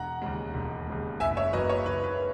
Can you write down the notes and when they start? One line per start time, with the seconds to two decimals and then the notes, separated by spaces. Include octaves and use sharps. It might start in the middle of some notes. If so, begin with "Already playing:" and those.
Already playing: E1 F#5 A#5
0.22 D#2 C#3 G#3
0.54 E1
0.87 D#2 C#3 G#3
1.20 F#1 E5 G#5
1.37 C#5 E5
1.53 F#2 C#3 F#3 A#3 B4 D#5
1.69 C#5
1.86 F#1 B4
2.04 B4